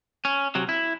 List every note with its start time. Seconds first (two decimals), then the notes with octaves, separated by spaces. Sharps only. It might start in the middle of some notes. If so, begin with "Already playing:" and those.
0.25 C#4
0.55 C3 F#3
0.69 E4